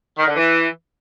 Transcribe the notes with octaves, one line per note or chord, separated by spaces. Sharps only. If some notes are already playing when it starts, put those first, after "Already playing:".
D#3
D3
E3